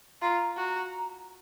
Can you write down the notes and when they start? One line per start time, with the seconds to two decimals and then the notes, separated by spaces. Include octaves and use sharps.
0.22 F4 A#5
0.57 F#4 A#5